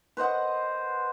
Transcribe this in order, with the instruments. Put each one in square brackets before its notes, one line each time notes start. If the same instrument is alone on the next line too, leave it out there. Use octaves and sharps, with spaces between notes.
[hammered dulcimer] B4 C5 D#5 F#5